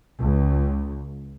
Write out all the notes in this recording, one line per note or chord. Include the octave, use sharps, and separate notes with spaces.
C#2